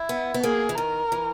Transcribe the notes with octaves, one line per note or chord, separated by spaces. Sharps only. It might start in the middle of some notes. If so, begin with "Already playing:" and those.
Already playing: E4
B3
B3
A#3 G#4
E3
D#3 A#4
E3